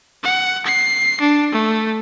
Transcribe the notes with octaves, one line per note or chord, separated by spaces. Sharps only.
F#5
C7
D4
A3